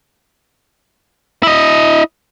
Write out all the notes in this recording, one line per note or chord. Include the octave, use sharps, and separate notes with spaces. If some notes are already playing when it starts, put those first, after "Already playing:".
E4 D#5